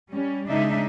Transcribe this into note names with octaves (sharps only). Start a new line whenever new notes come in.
G3 C#4
C#3 G#3 D4 D#4 E5